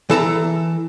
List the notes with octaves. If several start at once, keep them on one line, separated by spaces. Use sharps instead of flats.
E3 A4 A5 A#5